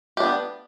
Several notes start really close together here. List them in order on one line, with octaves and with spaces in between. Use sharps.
G4 D4 B3